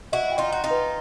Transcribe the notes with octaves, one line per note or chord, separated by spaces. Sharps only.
E4 F#4 D#5
G5
D#4 F4
F#4 C6
D#4 F4
B4